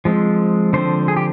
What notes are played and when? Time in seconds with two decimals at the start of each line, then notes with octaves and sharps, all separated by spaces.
0.05 F3 G#3 C4
0.73 D3 F3 C4 C5
1.08 G#4
1.17 G4